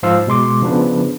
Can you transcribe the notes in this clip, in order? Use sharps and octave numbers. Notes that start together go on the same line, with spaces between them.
G#2 F3 C5 F5 E6
B2 G#3 C6 D6
C#3 F3 B3 D4 B4